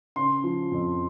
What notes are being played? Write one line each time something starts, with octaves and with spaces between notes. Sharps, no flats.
C#3 C6
F3
F2